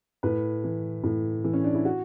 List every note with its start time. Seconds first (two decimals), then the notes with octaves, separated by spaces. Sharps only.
0.23 A2 B4
0.64 E3
1.04 A2
1.44 E3
1.53 C#4
1.64 D4
1.75 E4
1.85 F#4